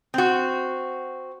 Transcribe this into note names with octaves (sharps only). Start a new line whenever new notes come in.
C4 F#4